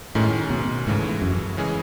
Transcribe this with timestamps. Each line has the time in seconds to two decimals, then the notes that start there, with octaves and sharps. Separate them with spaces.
0.15 F#2 A2 D#3 G#3 C#4
0.50 B2
0.87 C#2 G#2 C#3 E3 A3
1.22 F#2
1.57 C#3 E3 G#3 C#4 G#4